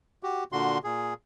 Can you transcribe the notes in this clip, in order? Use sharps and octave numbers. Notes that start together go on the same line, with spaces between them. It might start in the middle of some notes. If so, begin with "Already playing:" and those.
F#4 G4
A#2 D3 F#4 C6
A#2 G#4